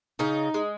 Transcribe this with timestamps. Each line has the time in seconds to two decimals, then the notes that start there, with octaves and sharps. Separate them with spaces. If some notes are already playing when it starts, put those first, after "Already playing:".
0.19 C#3 D#4
0.54 G#3